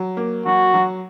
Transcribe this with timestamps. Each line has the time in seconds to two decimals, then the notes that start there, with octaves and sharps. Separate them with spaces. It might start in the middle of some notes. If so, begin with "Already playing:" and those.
Already playing: F#3
0.17 A#3
0.45 F#3 F#4
0.74 F#3